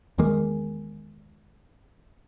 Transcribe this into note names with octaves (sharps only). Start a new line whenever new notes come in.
E2 D#3 G#3 A#3